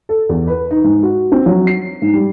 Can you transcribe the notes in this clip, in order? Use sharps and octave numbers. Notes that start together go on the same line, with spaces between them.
A4
E2
B4
D#4
G#2
F#4
C4
F#3
C7
G#2
G3